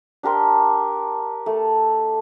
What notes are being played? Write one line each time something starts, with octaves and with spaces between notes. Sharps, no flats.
D4 G4 A#4 C6
A3 A4